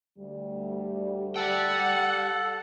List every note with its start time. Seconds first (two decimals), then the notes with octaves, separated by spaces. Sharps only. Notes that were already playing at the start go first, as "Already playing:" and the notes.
0.18 D2 G3
1.36 G4 A4 D5 F#5 G5